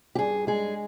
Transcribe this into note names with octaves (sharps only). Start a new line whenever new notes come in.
G4
G2 G#4
G#3 G#4